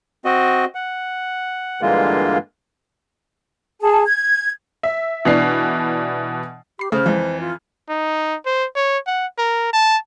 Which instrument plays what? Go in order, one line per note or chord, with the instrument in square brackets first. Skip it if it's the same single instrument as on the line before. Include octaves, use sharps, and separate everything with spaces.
[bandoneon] C4 F#4 D#5
F#5
G2 D3 E3 G#3 A#3 F4
[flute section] G#4 A5
G#6
[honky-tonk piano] E5
B2 E3 D4 C7
[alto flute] G4 [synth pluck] B5 C7
[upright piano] C#3 F6 [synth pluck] A3 D#6 [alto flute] C5
[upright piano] F2 E3 [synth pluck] F3 G#3
[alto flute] F4
[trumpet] D#4
C5
C#5
F#5
A#4
A5